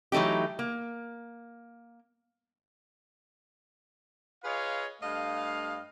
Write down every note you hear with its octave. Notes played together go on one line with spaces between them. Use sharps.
E3 F#3 A3 D#4 G4
A#3
F4 G#4 B4 C#5 D#5 F5
G2 A3 D#5 F5